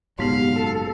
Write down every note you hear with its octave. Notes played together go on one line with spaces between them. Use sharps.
F#1 G#2 B2 F#3 B3 G4 F5
A4